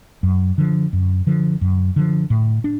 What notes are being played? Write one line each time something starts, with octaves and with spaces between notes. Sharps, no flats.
F#2
D3 F3
F#2
D3 F3
F#2
D3 F3
A2
D4